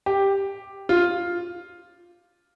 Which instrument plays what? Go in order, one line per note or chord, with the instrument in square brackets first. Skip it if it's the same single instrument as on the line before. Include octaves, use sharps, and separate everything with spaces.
[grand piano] G4
F4